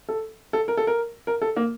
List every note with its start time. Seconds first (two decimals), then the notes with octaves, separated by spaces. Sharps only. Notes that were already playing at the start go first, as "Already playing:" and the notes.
0.09 A4
0.53 A4
0.68 A#4
0.77 A4
0.87 A#4
1.27 A#4
1.42 A4
1.56 A#3